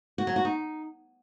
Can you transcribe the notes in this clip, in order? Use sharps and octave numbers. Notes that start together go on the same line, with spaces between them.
F#4
F#3
F#4
D#4